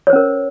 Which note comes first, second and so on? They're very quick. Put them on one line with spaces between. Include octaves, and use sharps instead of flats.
C#5 C5 C#4 A#4